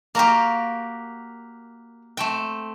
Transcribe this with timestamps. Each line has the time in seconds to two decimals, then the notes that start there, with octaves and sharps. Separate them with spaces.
0.15 A#3 F#4 G4 F5 A#5
2.17 A3 C4 G5